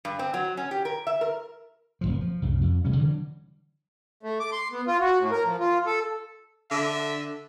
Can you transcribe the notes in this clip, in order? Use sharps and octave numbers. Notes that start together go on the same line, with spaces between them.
G2
C4
F#3
C#4
G4
A#4
E5
A#4
F1 C#2 F3
F3 F#3
C2 F#2 A2 C#3
F2
A1 C3 G3 C#4
D3 E3 F#3 G3
A3
D6
C6
B3
F4
F#4
A2
A#4
F3
F4
A4
D3 E5